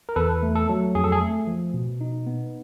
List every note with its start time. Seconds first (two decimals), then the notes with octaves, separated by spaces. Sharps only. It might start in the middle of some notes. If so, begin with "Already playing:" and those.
0.09 A#4
0.16 E2 A4 B4
0.43 A3
0.55 A4
0.69 F#3
0.95 F2 G#4
1.04 A4
1.12 G#4
1.21 A3
1.47 F3
1.74 B2
2.01 D#4
2.27 B3